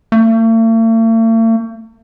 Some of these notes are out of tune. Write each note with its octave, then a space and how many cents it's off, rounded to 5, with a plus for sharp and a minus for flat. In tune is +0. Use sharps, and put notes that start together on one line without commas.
A3 +45